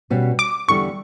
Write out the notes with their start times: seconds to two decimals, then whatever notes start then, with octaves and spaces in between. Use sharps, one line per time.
0.10 B2 G3 C#4
0.39 D6
0.68 E2 D3 G3 C#6